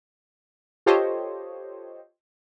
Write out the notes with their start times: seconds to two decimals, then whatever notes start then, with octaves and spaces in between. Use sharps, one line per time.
0.86 F4 G4 A4 C5 C#5 D#5